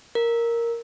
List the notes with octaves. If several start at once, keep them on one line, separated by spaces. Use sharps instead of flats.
A#4